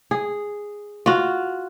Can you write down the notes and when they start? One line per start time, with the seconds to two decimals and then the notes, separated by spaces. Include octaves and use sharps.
0.11 G#4
1.06 F4 F#4